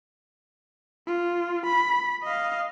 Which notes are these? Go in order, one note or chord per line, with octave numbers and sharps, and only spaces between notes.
F4
B5
D#5 F5